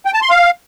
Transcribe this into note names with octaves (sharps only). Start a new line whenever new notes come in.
G5
A5
C6
F5